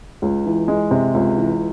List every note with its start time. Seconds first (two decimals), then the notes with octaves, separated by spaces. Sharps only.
0.22 C#2
0.46 E3
0.68 G#3
0.91 C3
1.14 C#2
1.38 E3